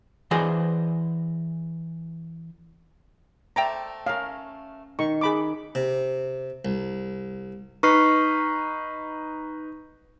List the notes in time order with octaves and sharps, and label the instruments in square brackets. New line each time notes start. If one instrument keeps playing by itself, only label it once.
[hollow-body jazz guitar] E3 G#4 C5 D5 D#5
[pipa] A3 D5 G5 [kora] C5 [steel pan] E5 A#5
[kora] C#4 A#4 [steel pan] F5
[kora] D#3 [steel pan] C#6
[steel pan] G#4 B5 D6
[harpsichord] C3
C2
[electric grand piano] D#4 B4 [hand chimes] C#6 F6 C7